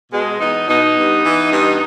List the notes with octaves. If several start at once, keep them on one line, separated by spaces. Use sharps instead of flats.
B2 G#3
E2 B3 D#4
B2 B3 D#4
G2
E3
G2